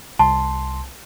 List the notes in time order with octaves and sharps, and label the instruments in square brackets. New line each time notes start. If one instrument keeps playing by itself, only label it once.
[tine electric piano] C2 C6 [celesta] A5